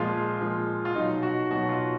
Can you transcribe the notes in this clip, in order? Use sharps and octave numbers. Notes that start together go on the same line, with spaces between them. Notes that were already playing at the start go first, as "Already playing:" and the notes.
Already playing: A#2 F3 G#3 F4
A#2 F3 G#3
F4
B2 F#3 D#4
F#4
B2 F#3 F#4
F4